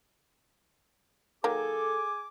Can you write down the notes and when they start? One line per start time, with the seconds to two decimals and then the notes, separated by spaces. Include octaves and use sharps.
1.44 D#3 F#3 A#3 G#4 A4 G#5 D6